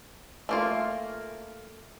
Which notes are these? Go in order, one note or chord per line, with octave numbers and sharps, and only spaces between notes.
A3 A#3 F4